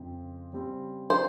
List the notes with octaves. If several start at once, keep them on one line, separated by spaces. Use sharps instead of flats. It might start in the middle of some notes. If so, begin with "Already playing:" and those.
Already playing: F2 C#3 F3 C4
C#3 G3 C4
C5